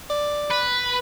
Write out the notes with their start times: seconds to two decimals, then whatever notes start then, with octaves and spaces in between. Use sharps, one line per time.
0.10 D5
0.51 B4